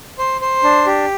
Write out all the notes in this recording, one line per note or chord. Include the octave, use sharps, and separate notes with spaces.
C5
C5
D4
G4